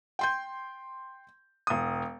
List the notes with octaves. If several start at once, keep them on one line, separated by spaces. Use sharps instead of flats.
G5 C6 G6
E1 D#6